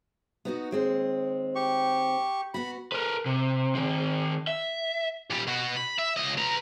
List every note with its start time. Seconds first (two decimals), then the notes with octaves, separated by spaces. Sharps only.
0.45 B3 D#4 F#4
0.71 D#2 G#3 C4
1.55 G4 C#6
2.54 B3 F#4 B5
2.92 A#4 B4
3.26 C3
3.75 D#3 C4
4.47 E5
5.30 A#2 G3
5.47 B2 F#4
5.77 B5
5.99 E5
6.16 C#2 D#5
6.38 B4 A#5